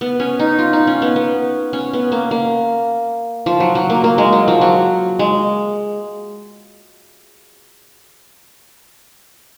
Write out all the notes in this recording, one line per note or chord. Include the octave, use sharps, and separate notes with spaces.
B3
C#4
D#4
F4
D#4
C#4
B3
B3
C#4
B3
A#3
A#3
F3
F#3
F#3
A#3
A#3
G#3
F#3
F3
F#3
G#3